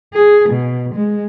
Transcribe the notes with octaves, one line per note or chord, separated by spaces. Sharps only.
G#4
B2
G#3